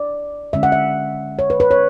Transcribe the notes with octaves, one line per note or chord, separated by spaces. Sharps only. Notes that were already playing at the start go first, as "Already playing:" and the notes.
Already playing: D5
D3 G#3 C#4 E5
F#5
E5
C#5
B4
B4
C#5